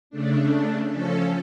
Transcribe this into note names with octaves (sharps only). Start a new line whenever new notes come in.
C#3 A3 D4
F3 C#4 A4